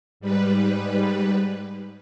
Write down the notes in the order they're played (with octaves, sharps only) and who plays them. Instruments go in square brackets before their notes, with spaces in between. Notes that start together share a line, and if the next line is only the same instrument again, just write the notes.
[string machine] G#2 G3 B4